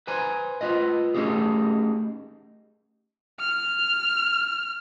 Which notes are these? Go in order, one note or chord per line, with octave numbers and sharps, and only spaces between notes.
B4 C5 G#5 A#5
F4 B4 D#5
A3 C#4 D#4 G4 G#4
F6